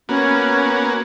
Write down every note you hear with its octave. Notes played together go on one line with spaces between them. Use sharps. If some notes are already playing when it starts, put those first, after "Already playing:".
A#3 B3 C#4 F#4